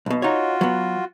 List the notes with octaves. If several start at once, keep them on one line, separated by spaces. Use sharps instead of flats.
B1 B2
D#4 F4 F#4 C#5
F#3 B3